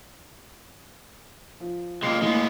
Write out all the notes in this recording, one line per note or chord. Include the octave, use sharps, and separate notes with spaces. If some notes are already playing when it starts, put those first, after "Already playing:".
F3
C#2 G#3 A#3 G5 C7
A2 E3 G#3 A#3 B3